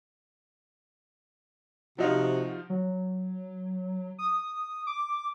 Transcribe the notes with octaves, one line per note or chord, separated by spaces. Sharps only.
C3 F3 D#4 F4 F#4
F#3
D#6
D6